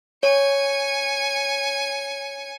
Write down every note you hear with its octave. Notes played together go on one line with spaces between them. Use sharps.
C#5 G#5 C#7